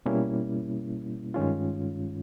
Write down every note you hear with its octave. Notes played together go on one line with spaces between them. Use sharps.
B2 G3 A#3 C#4 E4
G2 D#3 G#3 C#4 F4